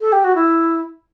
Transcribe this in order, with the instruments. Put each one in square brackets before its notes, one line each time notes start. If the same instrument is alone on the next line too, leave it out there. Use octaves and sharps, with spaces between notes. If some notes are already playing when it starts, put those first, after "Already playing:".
[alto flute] A4
G4
F#4
E4